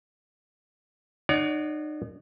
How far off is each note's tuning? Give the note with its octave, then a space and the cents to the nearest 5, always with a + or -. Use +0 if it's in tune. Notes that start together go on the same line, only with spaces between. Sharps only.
D#4 -35 C#5 +45 F#5 +0